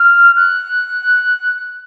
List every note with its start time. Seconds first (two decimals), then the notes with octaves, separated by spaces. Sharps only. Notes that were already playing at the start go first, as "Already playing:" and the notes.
Already playing: F6
0.36 F#6